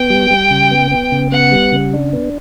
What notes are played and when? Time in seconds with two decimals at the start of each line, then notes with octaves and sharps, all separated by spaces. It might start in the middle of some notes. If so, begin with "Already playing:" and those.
Already playing: B3 G5
0.10 G3
0.31 G3
0.50 C#3
0.71 B3
0.91 B3
1.12 C#3
1.32 B3 F#5
1.52 G3
1.72 C#3
1.93 D4
2.13 B3